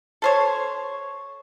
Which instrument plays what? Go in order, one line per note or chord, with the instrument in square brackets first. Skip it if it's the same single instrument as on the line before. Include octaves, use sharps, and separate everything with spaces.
[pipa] A4 C5 C#5